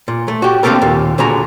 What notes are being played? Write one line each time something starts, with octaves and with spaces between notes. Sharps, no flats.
A#2
A3
F#4 G4
D3 A#3 C4 G4 A4 A#4
D#2 A#2
C#2 A#2 D3 F#4 G#4 A#5